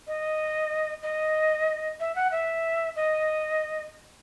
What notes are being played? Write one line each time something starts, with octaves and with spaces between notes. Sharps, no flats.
D#5
D#5
E5
F#5
E5
D#5